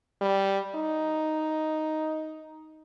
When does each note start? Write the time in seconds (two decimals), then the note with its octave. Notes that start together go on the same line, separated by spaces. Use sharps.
0.21 G3
0.75 D#4